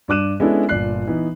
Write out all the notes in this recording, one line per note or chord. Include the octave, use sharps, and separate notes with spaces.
G2 D4 D6 F#6 D#7 E7
G#3 B3 C#4 D4 E4 A4
G1 A#2 D5 F#6 C7
E3 B3 D#4